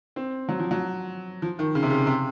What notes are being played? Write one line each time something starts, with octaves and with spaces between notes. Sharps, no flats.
C4
F#3
F3
F#3
F3
D#3
C#3
C3
C#3
C3